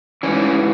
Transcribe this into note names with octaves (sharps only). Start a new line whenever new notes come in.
G#2 E3 C#4